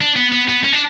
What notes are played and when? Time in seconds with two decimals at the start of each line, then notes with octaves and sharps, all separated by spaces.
0.01 D4
0.16 B3
0.32 B3
0.48 B3
0.64 C#4
0.73 D4